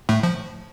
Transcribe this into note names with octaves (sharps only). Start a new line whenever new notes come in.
A2 A3
F3